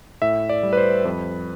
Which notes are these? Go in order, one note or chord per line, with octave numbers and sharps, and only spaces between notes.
A2 E5
D5
G3
B4
C5
F2 B4